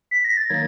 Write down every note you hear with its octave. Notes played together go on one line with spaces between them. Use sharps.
B6
A#6
A6
D#3 F#3 A#3 D#4 G#6